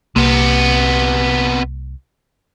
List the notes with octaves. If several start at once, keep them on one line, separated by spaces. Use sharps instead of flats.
C2 C3 A#3 B3